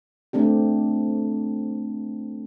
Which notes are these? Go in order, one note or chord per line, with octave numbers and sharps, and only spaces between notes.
A3 C4 D4 G4